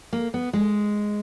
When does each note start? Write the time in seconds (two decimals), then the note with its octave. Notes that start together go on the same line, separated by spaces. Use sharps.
0.13 A#3
0.34 B3
0.53 G#3